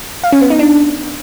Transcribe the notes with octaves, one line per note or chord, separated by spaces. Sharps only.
F5
C#4
B3
D#4
D4